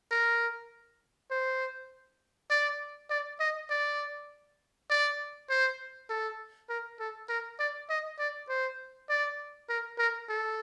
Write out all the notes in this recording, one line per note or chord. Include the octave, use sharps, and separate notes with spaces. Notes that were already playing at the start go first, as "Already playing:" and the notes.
A#4
C5
D5
D5
D#5
D5
D5
C5
A4
A#4
A4
A#4
D5
D#5
D5
C5
D5
A#4
A#4
A4